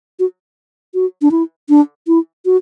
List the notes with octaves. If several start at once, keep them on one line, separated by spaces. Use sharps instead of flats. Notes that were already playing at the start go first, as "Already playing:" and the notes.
F#4
F#4
D4
E4
D4
E4
F#4